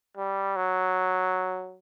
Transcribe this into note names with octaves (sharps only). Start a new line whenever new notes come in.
G3
F#3